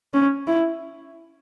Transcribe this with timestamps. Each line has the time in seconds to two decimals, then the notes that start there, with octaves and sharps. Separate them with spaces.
0.14 C#4
0.47 E4